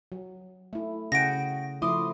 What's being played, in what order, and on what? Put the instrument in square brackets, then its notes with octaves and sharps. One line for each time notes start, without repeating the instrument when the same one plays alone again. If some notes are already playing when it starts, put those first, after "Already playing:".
[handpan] F#3
A3 E4
[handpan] C#3 G#4 F#5 [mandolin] F#4 G5 [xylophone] A#6 D7
[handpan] F3 A3 E4 [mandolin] C6 D6 D#6